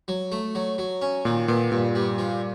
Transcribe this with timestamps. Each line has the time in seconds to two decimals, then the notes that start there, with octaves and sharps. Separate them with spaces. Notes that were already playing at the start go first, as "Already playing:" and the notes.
0.08 F#3
0.32 A3
0.55 F#3
0.78 F#3
1.02 C#4
1.25 A#2 D#3
1.48 A#2 B3
1.72 G2 A#2
1.95 G3
2.18 F3